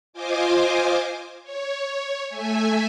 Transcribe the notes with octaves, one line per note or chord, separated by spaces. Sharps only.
F4 C5 D#5 G#5 D6
C#5
A3 E5 G#5